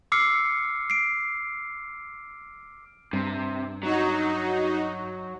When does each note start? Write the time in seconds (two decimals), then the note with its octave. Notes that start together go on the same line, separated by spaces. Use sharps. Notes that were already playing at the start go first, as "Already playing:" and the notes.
0.12 D6 E6 F6 C7 C#7
0.90 C7 D7
3.13 G2 C3
3.83 F#3 D#4 F#4